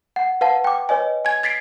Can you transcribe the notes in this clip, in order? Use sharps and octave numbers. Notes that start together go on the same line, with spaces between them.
F#5
B4 F5 F#5 A5
G5 D6
B4 C#5 D#5 G#5
G#5 G#6
G#6 A6 B6 C7 D7